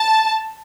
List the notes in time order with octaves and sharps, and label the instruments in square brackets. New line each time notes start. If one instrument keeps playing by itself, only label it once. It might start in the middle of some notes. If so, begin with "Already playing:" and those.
Already playing: [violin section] A5